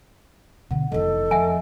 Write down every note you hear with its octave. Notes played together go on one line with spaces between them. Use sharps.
B2 D3 F#5
F1 E3 A4 D#5
F2 E5 F#5 G#5